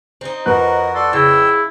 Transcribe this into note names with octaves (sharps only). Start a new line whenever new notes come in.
C4 D#4
F2 F#4 A#4 B4 F#6
F#4 A4 D5 C6
C#3 E4 G5 E6